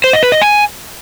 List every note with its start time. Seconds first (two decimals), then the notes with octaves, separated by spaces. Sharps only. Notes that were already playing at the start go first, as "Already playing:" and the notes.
0.04 C5
0.13 D#5
0.23 B4
0.32 D#5
0.41 G#5